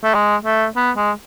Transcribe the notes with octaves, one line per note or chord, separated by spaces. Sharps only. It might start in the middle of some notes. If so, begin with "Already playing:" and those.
A3
G#3
A3
B3
G#3